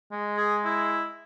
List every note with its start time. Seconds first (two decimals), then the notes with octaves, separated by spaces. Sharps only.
0.12 G#3
0.37 G#4
0.65 E4